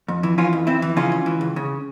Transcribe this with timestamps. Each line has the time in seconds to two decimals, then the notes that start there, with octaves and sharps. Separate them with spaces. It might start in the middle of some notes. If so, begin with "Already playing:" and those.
0.08 F2
0.23 E3
0.38 E3 C#4 F4
0.53 F2
0.67 F2 C4 E4
0.82 E3
0.96 C#3 C#4 F4
1.12 C#2
1.26 E3
1.41 C#2
1.56 C#3